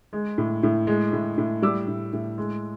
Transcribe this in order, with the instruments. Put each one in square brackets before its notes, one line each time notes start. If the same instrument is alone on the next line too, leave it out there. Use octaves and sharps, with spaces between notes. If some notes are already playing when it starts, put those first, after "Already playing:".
[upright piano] G#3
A2
A2
G#3
A2
A2
G3 D6 E6
A2
A2
G#3